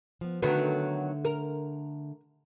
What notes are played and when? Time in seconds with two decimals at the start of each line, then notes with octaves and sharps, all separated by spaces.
0.21 F3 B3
0.42 D3 D#3 F#3 A3 B3
1.25 A#4